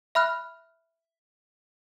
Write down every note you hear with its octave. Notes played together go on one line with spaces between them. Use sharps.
E5 B5 F6 F#6